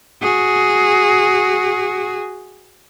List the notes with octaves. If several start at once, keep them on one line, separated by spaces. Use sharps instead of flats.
F#4 G#4